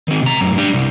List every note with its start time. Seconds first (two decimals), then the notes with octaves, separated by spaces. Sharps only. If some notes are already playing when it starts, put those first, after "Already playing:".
0.08 D#3 C4
0.23 C3 A#5
0.41 F#2 A2
0.58 D4 G4
0.73 C2